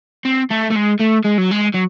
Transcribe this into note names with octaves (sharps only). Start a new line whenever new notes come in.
C4
A3
A3
G#3
A3
G#3
F#3
G#3
F#3